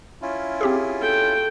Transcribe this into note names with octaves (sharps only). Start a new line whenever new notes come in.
C#4 E4 F4
C4 G4 G#4
A4 G5